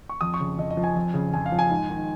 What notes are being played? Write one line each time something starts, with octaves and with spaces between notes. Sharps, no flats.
C#6
F2 D#6
C#6
C#3
F2 D#5
D#5
F3
G#5
F2
C#3
F2 G#5
F5
F3
G#5
G#2
D#3